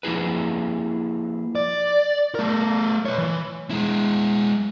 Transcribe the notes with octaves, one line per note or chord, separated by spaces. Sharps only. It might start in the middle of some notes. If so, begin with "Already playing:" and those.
F3 A#3 E4 G#4 B4
D5
A3 A#4
B4 C#5
E3
G#3 E4